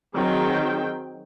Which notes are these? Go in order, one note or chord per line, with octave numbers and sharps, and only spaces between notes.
D#3 F#3 C4 G#4 G5